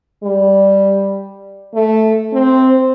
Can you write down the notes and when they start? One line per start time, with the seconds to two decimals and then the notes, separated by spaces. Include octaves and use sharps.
0.24 G3
1.75 A3
2.34 C4